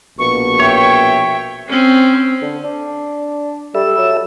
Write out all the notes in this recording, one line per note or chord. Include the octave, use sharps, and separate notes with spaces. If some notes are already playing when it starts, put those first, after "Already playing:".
A#1 B2 A#3 C#6
C#5 E5 G5
C4 C#4
D3
D4
G3 A4 E5 E6
F#3